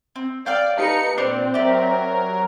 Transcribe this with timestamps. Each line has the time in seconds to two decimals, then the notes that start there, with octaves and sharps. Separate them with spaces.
0.16 C4
0.46 D5 F5 G5 E6 F6 G6
0.77 D#4 G4 B4 D#5 A5 C#7
1.18 A#2 C4 D4 C5 D5 C7 F7
1.54 F#3 G4 A#4 D5 E5